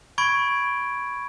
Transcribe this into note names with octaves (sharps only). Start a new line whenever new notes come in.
B5 C#6 G#6 D7